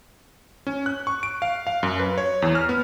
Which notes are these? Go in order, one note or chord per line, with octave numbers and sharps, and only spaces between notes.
C#4
F#6
C#6
D7
F5
F5
F#2
B4
C#5
E2
F6
B3